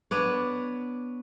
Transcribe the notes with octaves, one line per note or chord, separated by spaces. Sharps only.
B3 D4 C#5